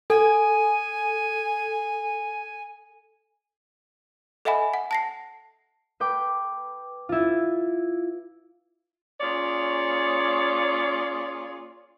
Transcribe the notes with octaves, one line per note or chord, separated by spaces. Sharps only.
A4 G#5
A4 D#5 E5 F#5 G#5 B5
F#5
A5 A#6 C7
B4 G5 D6
E4 F4
A#3 C#4 F4 G#4 C#5 D5